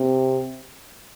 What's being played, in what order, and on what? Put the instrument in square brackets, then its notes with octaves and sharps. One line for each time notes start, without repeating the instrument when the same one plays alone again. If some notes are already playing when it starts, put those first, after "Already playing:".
Already playing: [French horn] C3